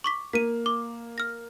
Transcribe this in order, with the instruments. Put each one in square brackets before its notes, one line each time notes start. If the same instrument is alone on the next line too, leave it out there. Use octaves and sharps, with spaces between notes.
[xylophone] C#6 D6 B6
[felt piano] A#3 [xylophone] B6 D#7
[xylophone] D6
F6 A#6